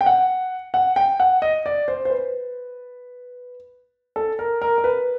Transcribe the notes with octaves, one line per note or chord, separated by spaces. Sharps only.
G5
F#5
F#5
G5
F#5
D#5
D5
C5
C5
B4
A4
A#4
A#4
A#4
B4